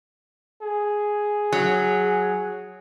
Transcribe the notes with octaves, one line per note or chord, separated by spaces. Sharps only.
G#4
F#3